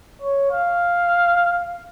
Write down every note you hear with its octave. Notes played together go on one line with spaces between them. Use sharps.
C#5
F5